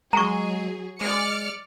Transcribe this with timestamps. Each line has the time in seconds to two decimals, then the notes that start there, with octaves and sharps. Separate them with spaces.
0.13 F#3 G#3 G#4 A#5 C#6
1.01 G#3 D5 F6 C#7